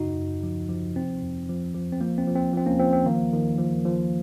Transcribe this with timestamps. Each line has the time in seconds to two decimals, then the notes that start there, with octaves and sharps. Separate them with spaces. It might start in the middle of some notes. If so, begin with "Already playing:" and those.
Already playing: F#2 C#3 D#4 F#4
0.17 F#2
0.43 F3
0.69 F3
0.95 C3 C4
1.22 F2
1.49 F3
1.74 F3
1.92 C4
2.01 F3 A#3
2.18 C4
2.28 F3
2.36 C4
2.53 F3 C4
2.66 A#3 C#4
2.79 F3 C4
2.93 C4
3.06 D#3 A#3
3.33 D#3
3.58 F3
3.85 F3